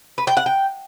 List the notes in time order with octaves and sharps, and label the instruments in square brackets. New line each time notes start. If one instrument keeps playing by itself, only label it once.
[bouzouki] B4
G5
F#5
G5